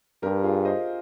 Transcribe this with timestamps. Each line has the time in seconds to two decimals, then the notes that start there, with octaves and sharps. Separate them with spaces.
0.22 G2 G4 A#4
0.44 F4 G#4
0.65 C5 D#5